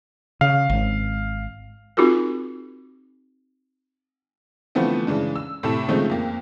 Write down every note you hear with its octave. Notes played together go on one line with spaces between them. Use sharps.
C#3 F5
G#1
C4 D#4 F4 F#4 G#4 A#4
D3 E3 F3 A3 B3 C4
C#3 E3 G#3 D4
E6
A2 C3 A4 E7
C#3 F3 G#3 A3 C4 D#4
F2 A#3